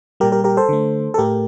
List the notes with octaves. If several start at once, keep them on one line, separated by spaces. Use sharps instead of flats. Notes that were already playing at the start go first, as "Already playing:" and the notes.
A#2 G3 G4 A#4
G4 A#4
G4 A#4
A4 C5
D3 A3
A4
A2 A3 G4 A#4